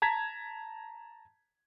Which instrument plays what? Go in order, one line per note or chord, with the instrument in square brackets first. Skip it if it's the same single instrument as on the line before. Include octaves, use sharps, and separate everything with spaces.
[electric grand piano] A5 A#5 G#6 B6